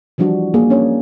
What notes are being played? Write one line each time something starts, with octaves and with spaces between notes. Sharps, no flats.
E3 F3 G3 D4 F#4
A#3 G#4 A#4
C#4 D4 C#5